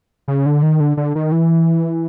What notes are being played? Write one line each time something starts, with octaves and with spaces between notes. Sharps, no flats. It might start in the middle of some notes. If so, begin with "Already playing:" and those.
C#3
D3
D#3
D3
D3
D#3
E3